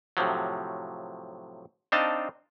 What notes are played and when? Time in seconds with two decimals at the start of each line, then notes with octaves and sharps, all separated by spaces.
0.17 A2 C3 F3 F#3
1.92 C4 D4 D#4 D#5 F5 A5